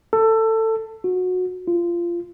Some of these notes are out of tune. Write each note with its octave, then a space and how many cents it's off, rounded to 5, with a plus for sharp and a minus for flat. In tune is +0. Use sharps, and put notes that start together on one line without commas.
A4 +20
F#4 -20
F4 -20